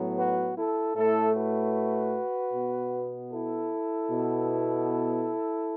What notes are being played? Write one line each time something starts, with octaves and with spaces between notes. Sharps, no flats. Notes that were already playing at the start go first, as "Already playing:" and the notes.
Already playing: A2 F#3 B3
F#4 B4
E4 A4
A2 A3 E4 A4
F#4 B4
B2 B3
E4 A4
B2 B3